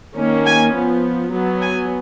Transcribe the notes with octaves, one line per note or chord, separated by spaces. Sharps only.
D#3 A#3 C#4
G#5
F3 B3
F#3 B3
G#5